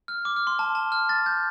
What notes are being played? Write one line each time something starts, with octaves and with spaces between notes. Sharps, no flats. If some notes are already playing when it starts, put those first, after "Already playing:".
F6
D6
F6
C6
A5
A5
F6
A6
G6